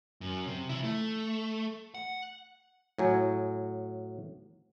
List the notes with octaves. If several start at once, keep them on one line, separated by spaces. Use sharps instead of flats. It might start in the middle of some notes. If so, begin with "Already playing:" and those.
F#2
C3
F3 E4
A3
F#5
A2 F#3 G#5